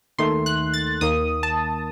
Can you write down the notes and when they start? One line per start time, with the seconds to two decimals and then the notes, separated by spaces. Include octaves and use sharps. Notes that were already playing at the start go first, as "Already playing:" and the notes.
0.18 D#2 D#3 A3 C6
0.46 F#6
0.74 A6
1.01 D#2 D#3 A#3 D#6
1.43 A5